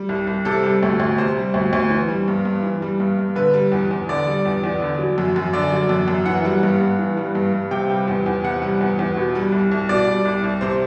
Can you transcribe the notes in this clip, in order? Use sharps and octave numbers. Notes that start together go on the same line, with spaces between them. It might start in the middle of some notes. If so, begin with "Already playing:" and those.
Already playing: G3
C2
C2
C3 A4
G3
D2
D2
C3 C5
G3
D2
D2
E3
G3
G2
G2
E3
G3
G2
G2
D3 B4
G3
E2
E2
D3 D5
G3
E2
E2
D3
F#3
F#2
F#2
D3 D5
F#3
F#2
F#2
E3 F#5
G3
G2
G2
E3
G3
G2
G2
C3 G5
G3
E2
E2
C3 F#5
G3
E2
E2
B2
G3
C2
C2
B2 D5
G3
C2
C2
C3 C5